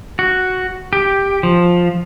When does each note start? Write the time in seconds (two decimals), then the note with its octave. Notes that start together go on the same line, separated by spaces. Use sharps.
0.19 F#4
0.93 G4
1.43 F3